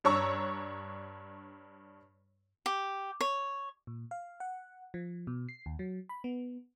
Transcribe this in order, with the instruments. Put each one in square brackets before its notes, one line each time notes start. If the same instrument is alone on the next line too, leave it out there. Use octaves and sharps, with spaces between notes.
[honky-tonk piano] G2 D4 C#5 A#5 C#6 E6
[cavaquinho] G4
C#5
[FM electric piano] A#2
F5
F#5
F3
B2
C7
D#2
F#3
B5
B3